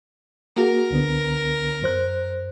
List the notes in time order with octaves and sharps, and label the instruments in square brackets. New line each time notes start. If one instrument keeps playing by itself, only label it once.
[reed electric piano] A#3 F#4 G#4 [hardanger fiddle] A#4
[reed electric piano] C#2 D3 B3
F#2 C5 F#6